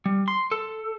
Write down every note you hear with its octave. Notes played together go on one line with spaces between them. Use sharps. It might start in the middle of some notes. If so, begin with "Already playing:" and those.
G3
C6
A4